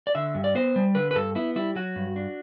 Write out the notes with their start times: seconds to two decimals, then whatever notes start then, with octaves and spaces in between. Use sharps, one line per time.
0.07 D5
0.15 D3 E5
0.35 G2
0.44 D5
0.55 B3 C5
0.76 G3
0.95 D3 B4
1.11 B4
1.15 G2 A4
1.35 B3 E4
1.56 G3 E4
1.76 F#3 F#4
1.96 G2
2.16 D4